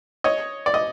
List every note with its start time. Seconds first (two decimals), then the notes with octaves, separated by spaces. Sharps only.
0.24 C#5 D#5
0.66 D5
0.74 D#5